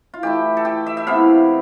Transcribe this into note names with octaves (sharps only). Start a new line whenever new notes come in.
F4
E3 A3 E4 G4
A4
G4
E5
E5
C3 E3 B3 E4 F5